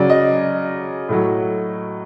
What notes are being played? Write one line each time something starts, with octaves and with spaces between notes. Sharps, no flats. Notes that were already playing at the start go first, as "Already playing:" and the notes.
Already playing: C#3 F#3 D5
D#5
A2 F#3